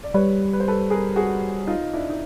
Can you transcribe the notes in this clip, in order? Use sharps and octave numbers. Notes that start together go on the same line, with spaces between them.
D5
G3 B4 C#5
B4
C5
A4 B4
G#4 A#4
F#4 G#4
D#4 F4
D4 E4
D#4